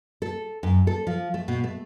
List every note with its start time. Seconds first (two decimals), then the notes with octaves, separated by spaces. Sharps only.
0.22 A4
0.63 F#2
0.87 A4
1.07 F3
1.34 A3
1.48 B2
1.64 A3